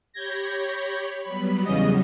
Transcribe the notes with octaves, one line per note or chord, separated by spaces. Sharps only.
G4 C#5 B5 G6 G#6 A#6
F#3 G3 B3 B5
E2 C#3 D#5